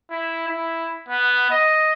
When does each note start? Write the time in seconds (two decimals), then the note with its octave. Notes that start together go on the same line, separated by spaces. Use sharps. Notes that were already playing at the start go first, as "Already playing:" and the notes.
0.11 E4
0.49 E4
1.08 B3
1.50 D#5